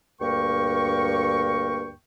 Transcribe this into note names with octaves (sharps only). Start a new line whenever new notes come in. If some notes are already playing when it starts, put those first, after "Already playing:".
D2 G2 A#3 A#4 G5 C#6